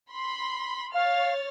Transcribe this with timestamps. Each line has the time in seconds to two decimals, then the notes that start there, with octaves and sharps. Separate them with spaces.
0.11 B5 C6
0.94 C#5 F5 F6 A6